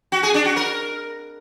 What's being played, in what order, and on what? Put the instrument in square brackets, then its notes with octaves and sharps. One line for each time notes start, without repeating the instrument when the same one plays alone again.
[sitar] F#4
G#4
D4
F#4
A#4